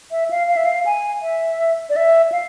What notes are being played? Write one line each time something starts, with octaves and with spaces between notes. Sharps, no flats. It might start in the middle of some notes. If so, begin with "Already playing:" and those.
E5
F5
F5
E5
F5
G#5
E5
D5
E5
F5